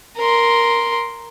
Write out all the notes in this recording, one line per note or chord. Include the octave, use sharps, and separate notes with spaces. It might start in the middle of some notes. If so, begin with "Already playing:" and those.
A#4 C6